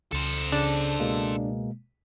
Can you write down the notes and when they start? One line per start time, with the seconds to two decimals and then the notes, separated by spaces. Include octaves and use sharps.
0.12 C#2 A4 C5
0.52 C#3 D4
1.00 B2 G#3 A#3